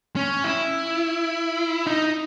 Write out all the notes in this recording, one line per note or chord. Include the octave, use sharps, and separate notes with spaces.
C#4
E4
D#4